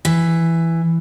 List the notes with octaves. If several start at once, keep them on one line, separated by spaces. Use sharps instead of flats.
E3